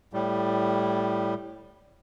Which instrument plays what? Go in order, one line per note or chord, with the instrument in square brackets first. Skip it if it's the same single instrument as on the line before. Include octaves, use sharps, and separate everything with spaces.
[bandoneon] A2 G3